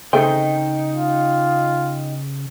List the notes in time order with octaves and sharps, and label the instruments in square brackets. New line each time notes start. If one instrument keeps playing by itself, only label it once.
[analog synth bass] C#3 [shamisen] A3 C4 G#4 [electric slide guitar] D#4 D#5 G5
[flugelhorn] F4